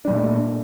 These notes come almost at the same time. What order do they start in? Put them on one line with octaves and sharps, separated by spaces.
D4 G3 A#2 A3